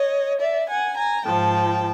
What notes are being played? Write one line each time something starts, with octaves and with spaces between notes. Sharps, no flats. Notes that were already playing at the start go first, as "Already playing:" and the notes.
Already playing: C#5 D#5
D5 E5
F#5 G#5
G#5 A#5
G#2 F3 G5 A5